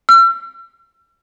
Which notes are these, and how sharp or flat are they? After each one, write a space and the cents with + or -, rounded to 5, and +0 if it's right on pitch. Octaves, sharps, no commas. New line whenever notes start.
E6 +45